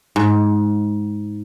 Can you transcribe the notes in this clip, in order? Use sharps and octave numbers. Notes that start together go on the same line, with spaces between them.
G#2